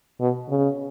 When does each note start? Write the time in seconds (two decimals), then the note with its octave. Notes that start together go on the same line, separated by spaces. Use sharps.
0.20 B2
0.49 C#3